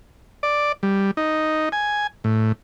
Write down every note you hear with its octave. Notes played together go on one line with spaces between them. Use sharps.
D5
G3
D#4
G#5
A2